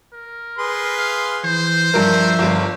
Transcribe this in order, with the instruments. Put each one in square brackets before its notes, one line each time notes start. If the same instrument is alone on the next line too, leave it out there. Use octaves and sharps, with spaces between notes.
[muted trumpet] A#4
[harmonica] G#4 B4 C6
[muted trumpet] F5
[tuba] E3 [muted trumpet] C5
[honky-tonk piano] G2 A#4 [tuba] F3 [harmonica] E5
[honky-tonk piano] G1 G2